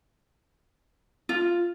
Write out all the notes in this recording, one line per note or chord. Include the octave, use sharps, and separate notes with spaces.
F4